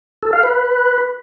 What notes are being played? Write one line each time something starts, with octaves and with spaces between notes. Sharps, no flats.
A4
F5
B4